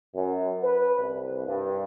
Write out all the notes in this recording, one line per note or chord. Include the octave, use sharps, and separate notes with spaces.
F#2
B4
C2
G2